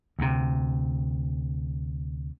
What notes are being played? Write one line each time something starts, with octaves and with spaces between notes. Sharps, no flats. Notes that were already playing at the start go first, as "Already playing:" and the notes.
D2 C3